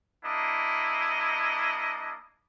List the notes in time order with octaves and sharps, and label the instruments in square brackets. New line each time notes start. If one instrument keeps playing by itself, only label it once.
[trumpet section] A#3 D4 E4 D#5